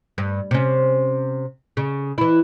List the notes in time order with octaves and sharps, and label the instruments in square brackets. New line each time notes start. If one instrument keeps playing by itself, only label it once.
[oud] G2
C3 C#4
C#3
E3 E4